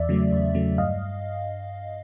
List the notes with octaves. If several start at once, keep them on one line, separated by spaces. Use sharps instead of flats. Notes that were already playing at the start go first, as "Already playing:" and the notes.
Already playing: E2 D5 E5
C#3 F#3 A3
E2
C#3 F#3 A3
G2 D#5 F5